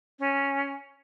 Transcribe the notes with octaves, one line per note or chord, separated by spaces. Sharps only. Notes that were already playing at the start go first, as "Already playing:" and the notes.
C#4